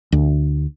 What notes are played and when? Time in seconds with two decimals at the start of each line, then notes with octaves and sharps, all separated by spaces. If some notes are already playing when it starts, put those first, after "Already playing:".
0.12 D2